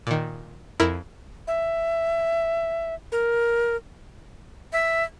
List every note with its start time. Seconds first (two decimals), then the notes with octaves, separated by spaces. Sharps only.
0.07 A#2 D#3
0.80 F2 E4 A#4
1.47 E5
3.12 A#4
4.73 E5